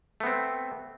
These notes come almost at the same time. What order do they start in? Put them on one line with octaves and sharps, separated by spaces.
A3 B3 C4